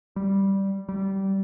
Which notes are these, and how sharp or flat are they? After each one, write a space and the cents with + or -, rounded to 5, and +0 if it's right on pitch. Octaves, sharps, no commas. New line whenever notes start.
G3 -5
G3 -20